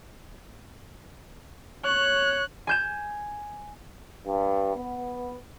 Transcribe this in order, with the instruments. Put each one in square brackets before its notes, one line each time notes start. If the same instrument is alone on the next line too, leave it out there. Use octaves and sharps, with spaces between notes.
[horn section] C#5 [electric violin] F#6
[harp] G#5 G6 E7
[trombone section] G2
B3